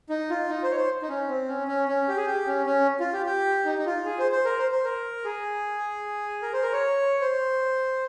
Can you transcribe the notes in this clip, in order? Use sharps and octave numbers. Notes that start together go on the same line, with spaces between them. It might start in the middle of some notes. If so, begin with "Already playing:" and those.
D#4
F4
D#4
C5
C#5
C5
D#4
C#4
C4
C#4
C#4
C#4
G4
G#4
G4
C#4
C#4
F4
G4
G4
D#4
D#4
F4
G#4
C5
C5
A#4
C5
C5
A#4
G#4
A#4
C5
A#4
C#5
C5